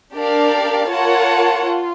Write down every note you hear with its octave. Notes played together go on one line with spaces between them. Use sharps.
D4 G4 A#4 D5 F5
F4 A#4 C#5 F#5 A5
F4